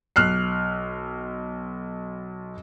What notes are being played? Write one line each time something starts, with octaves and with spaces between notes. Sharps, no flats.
B1 F6 F#6 C7